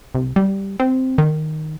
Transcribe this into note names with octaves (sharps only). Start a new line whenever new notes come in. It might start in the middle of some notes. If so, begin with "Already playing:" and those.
C2
G3
C4
D#3